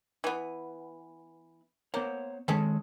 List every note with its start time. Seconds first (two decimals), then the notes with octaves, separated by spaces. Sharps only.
0.24 E3 B3
1.94 A#3 B3 C5 C#5
2.48 D#3 G#3 C#4 G#4 A4